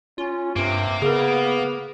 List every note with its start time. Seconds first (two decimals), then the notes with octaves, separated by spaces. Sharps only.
0.18 C#4 F4
0.56 G2 C3 A#3
1.02 C#3 B3 G#4 A#4